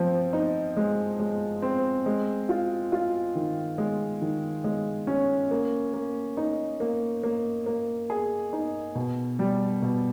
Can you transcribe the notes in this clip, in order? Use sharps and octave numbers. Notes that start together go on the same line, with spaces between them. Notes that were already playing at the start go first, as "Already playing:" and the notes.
Already playing: F3 C4
D#4
G#3
G#3
C4
G#3
F4
F4
D#3
G#3
D#3
G#3
C#4
A#3
A#3
D#4
A#3
A#3
A#3
G#4
D#4
B2
G3
B2